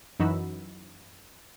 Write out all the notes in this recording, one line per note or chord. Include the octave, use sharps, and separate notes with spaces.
F#2 E3 D#4 F#4 B5 E6